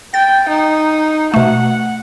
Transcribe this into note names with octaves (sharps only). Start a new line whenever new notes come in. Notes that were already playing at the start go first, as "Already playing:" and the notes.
G5 A6
D#4
B2 A3 F#5